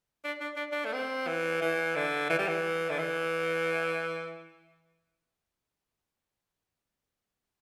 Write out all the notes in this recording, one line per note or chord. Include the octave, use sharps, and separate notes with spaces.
D4
D4
D4
D4
A3
C4
E3
E3
D3
E3
G3
E3
D3
E3